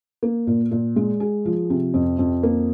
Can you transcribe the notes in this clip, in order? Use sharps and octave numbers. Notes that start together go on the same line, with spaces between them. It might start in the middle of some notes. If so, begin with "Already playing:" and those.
A#3
A#2
A#2
G#3
G#4
F3
C3
F2
F2
A#3